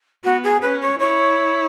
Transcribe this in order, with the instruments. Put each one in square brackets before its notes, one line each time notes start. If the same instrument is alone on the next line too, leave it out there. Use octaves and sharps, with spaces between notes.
[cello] B3 [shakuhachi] F#4
[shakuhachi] G#4
[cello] C#4 [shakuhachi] B4
[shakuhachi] C#5
[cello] E4 [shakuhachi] C#5